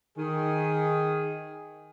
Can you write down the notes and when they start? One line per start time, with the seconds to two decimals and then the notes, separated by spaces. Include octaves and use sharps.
0.18 D#3 G#4